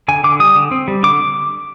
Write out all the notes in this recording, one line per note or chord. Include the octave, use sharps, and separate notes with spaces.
D3 G#5
D3 D6
G3 D#6
D3
C4
G3
D3 D6